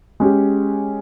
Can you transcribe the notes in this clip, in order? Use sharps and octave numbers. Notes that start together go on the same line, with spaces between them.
G#3 C#4 G4